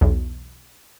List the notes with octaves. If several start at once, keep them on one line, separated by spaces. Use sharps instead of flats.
B1 E2